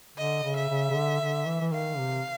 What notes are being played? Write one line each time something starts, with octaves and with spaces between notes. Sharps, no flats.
D3 D#5
C#3
E5
C#3
C#3
D3
D3
E3
E3
D#3 F5
C3